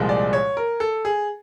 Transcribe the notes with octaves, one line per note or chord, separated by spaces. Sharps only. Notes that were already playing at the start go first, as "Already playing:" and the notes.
Already playing: C2 A#2 F3 G#3
D5
C#5
A#4
A4
G#4